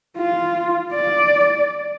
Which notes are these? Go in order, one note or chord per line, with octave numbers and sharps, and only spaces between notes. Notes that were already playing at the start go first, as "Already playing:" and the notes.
F4
D5